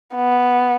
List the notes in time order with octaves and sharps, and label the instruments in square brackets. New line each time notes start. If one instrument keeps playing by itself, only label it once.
[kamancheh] B3